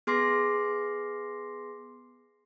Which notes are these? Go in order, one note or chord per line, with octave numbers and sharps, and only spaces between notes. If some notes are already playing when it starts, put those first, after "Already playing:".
B3 G#4 C6 D6 A#6 C7